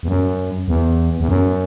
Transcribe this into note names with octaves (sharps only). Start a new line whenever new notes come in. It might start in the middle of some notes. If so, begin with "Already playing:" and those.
E2
F#2
E2
E2
F#2